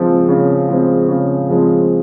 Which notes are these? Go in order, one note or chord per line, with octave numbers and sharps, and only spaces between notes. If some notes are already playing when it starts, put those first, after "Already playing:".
Already playing: C#3 F3 G#3 C4
C#3
F3 G#3 C4
C#3
F3 G#3 C4